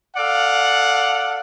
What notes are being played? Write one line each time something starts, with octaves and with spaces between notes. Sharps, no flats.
A4 D5 F5 F#5